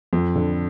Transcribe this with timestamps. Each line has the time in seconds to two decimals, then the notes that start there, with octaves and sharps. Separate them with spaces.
0.13 F2
0.36 D3